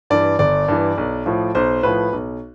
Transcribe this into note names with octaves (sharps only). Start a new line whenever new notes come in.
G2 E3 D5
G1 D5
G2 E3
B1
A2 F3
B1 C5
A2 F3 B4
B1